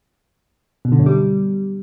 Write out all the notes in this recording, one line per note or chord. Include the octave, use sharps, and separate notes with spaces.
B2
D3
F#2
G3